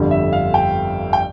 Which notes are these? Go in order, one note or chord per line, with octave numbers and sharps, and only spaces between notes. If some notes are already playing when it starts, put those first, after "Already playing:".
Already playing: G1 F2 D3 G3
E5
F5
G5
G5